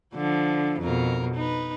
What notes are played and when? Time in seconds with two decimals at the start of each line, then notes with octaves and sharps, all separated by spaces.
0.14 D3 F3
0.80 F2 B2 A#4
1.35 D#4 B4